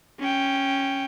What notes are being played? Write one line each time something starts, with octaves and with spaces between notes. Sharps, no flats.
C#4 G5